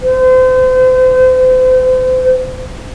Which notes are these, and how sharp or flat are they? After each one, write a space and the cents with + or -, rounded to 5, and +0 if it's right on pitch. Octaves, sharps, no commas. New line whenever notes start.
C5 -35